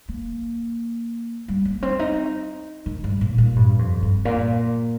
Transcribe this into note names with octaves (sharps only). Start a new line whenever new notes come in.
A#3
G3
A#3
C4
D#4
D#3
G2
A#2
A#2
G2
F2
G2
A#2